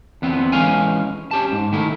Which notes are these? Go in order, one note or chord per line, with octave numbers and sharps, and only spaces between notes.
E2 B3 C4
E3 F3 G#3 C#4 F5 G#5
C#4 G4 A5
G#2
D#3 A3 E4